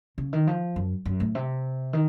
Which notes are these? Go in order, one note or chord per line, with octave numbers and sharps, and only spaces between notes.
C#3
D#3
F3
F#2
F#2
A2
C3
D#3